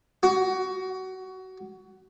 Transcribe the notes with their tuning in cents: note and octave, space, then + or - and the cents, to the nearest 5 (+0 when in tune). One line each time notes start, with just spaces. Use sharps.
F#4 +20